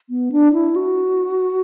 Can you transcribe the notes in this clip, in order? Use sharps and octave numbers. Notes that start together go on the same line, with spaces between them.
B3
D4
E4
F#4